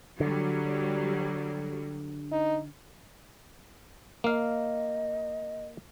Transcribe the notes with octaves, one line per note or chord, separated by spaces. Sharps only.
D3 F#3 G3
D#4
A#3 D#5 F5